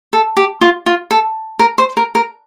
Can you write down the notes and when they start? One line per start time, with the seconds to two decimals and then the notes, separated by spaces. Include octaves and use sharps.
0.13 A4
0.37 G4
0.61 F4
0.86 F4
1.11 A4
1.59 A#4
1.78 C5
1.97 A#4
2.15 A#4